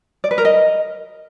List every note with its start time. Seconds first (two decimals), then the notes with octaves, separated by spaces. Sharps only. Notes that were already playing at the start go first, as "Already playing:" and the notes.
0.24 D5
0.31 B4
0.38 A#4
0.45 D#5